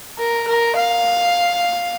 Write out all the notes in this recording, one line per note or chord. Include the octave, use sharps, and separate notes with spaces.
A#4
A#4
F5